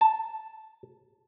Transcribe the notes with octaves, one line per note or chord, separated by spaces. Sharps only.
A5